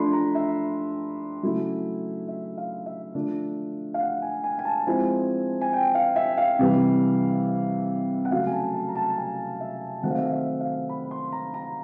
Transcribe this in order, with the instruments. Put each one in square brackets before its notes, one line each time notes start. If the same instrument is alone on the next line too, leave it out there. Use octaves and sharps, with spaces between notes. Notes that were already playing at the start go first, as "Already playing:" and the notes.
Already playing: [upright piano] F3 A3 D4 B5 C6
A#5
E5
C#3 F#3 A3 C#4 E4
E5
F5
E5
D3 F3 A3 D4
F5
F#5
G#5
G#5
G#5
A5
F3 G#3 C4 E4 G#5
G#5
G5
F5
E5
F5
C3 E3 G3
F#5
C#3 F#3 A3 F5
G#5
A5
A5
A#5
A5
G#5
E5
D#3 F#3 A3 C4 F#5
F5
E5
F5
E5
F5
B5
C6
A#5
A#5